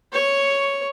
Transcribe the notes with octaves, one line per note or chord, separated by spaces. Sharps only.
C#5 C#6